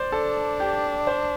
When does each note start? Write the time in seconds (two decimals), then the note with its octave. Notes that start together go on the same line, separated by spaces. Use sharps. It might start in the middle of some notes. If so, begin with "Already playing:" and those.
Already playing: C5 D5
0.12 D4 A4
0.60 G4
1.07 C5